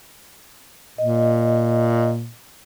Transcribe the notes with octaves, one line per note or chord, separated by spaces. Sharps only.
A#2 D#5